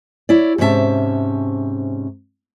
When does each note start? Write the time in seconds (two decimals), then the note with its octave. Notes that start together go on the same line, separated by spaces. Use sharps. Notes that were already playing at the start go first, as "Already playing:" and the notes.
0.29 E4 C#5 D5
0.58 G#2 C3 C#4 D#4 E5 A5